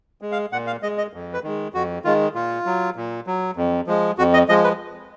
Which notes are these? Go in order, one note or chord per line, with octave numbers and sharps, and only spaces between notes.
G#3
F5
A#2 F#5
F5
G#3 D#5
D#5
F2
B4
D#3 G#3
F2 F#4
D#3 G#3 F4
A#2 F4
F#3
A#2
F#3
F2
F3 G#3
F2 F#4
D#5
F3 G#3 D#5
B4